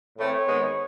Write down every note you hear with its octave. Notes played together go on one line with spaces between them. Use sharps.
A2 E3 A3 C4 C#5
G#2 D#3 G#3 B3